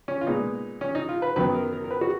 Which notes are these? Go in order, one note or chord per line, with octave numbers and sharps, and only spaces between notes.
C#4
F4
A#2 G#3 B3 D#4
C#4
D#4
F4
B4
F#2 D#3 F#3 B3 B4
A#4
A#4
A#4
B4
F#4